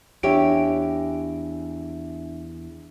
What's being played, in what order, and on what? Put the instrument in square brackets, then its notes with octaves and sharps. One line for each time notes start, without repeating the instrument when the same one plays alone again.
[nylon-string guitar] E2 G4 C#5 [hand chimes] D4 E5 D7